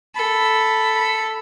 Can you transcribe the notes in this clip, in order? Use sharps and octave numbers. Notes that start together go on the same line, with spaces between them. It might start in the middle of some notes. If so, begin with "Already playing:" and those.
A4 B5